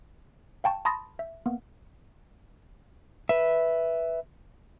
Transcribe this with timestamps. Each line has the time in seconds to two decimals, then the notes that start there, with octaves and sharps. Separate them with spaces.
0.64 F5 G5 A5 C#6
0.85 A5 B5 C6 D#6 A6 A#6
1.19 E5
1.46 A#3 B3
3.29 B4 E5